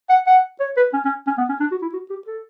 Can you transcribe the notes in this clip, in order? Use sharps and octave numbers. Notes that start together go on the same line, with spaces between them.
F#5
F#5
C#5
B4
C#4
C#4
C#4
B3
C#4
D4
F#4
E4
F#4
G4
A4